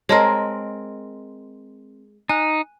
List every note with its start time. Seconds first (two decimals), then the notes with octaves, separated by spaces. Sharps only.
0.09 G#3 C4 A#4 C#5 D#5 A5
2.29 D#4 G#5 F#6